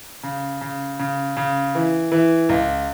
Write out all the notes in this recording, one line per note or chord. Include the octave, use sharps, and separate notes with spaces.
C#3
C#3
C#3
C#3
E3
E3
C#2